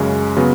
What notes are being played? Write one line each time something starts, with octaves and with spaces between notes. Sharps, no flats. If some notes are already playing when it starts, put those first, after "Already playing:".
Already playing: F#2 C#3 G#3 C#4
C#3 F#3 B3